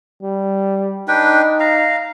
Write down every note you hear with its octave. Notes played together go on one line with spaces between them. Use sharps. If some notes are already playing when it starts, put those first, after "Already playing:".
G3
D4 D#4 B4 G5
F5 A#5